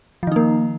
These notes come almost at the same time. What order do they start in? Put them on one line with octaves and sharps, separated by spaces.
F3 D#3 D#4 A#3